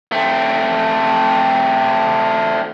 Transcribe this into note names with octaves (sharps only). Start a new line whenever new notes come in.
A3 C4